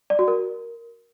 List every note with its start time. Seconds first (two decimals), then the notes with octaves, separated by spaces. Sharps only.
0.10 D5
0.19 F#4
0.28 A#4